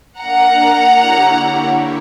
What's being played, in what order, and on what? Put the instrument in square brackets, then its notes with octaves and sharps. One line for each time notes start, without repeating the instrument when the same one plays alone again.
[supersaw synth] A#3 D4 A#4 [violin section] F#5 A#5
[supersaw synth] D3 A#3 E4 G4 C#5